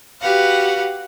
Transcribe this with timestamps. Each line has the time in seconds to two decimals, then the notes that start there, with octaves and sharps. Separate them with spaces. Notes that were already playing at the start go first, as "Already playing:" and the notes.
0.21 F#4 G4 B4 F5 F#5